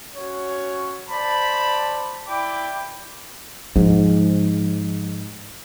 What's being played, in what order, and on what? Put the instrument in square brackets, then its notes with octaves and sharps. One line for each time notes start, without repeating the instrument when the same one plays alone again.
[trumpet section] C#4 F#4 C#5
C5 D5 A5 B5
E4 D5 G5 B5 D6
[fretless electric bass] G#2 [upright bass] F3